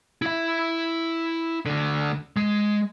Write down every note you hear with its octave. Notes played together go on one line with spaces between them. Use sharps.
E4 E5
D2 D3
G#3